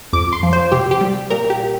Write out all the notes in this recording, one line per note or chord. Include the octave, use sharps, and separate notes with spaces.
F2 D6
C6
F3
C5
C3 G4
G4
G3
A#2 A#4
G4